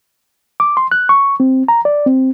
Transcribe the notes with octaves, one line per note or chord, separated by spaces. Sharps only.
D6
C6
F#6
C#6
C4
A#5
D5
C4